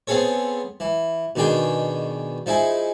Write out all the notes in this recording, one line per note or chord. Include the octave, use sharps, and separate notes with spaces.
B3 C4 G#4 A4 C#5
E3
B2 D#3 D4 G#4 G5
F3 D#4 E4 G#4